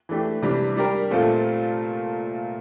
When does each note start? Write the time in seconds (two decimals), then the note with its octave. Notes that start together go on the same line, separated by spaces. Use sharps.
0.09 E3 A3 D4 G4
0.42 C3 E3 G3 D4
0.77 G3 D4 G4 A#4
1.11 A#2 A3 C4 F4 A4